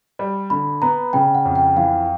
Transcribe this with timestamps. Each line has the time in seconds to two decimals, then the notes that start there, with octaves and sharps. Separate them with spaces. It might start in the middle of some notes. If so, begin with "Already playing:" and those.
0.19 G3
0.50 D3 B5
0.82 B3 A#5
1.13 C#3 G5
1.35 F#5
1.45 F2
1.56 G5
1.77 E3 F5